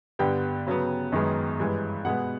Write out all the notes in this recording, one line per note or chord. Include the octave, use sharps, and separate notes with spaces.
G2 D3 G3 B3 G5
C#3 F#3 B3
F#2 D#3 G#3 B3
G2 E3 G#3
B2 G#3 B3 F#5